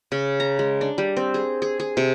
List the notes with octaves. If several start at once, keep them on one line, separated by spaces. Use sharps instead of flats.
C#3
A#5
G#3
D4
G3
C4
G#4
G#4
G#4
C3